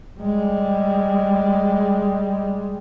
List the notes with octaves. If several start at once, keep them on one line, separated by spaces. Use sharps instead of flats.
G3 G#3